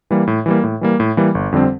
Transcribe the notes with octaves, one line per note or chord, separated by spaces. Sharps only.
E3 G3 A#3
A2
E3 G3 A#3
A2
E3 G3 A#3
A2
E3 G3 A#3
G1
F2 D3 G3 C4